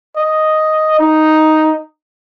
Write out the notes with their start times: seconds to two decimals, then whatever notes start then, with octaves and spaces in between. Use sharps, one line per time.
0.17 D#5
0.99 D#4